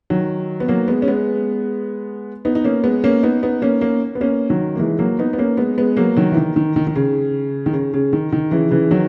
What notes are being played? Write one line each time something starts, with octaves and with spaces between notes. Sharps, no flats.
D#3 F#3
B3
F#3 A#3
G#3 B3
C#4
G#3 B3
B3 D#4
D#4
A#3 C#4
G#3 B3
A#3 C#4
B3 D#4
B3 D#4
A#3 C#4
A#3 C#4
B3
A#3 C#4
D#3 F#3
A#3
E3 G#3
F#3 A#3
B3 D#4
B3
A#3 C#4
G#3 B3
G#3 B3
F#3 A#3
D#3 F#3
E3
D#3
D#3
D#3
D#3
C#3
D#3
C#3
C#3
D#3
D#3
C#3 E3
C#3 E3
D#3 F#3